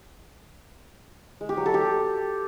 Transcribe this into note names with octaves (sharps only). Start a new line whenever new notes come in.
G#3
G4
F#3
A4
G4